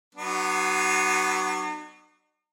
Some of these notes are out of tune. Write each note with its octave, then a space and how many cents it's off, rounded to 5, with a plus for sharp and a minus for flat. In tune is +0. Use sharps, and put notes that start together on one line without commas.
F#3 +25 B3 +0 D#4 -45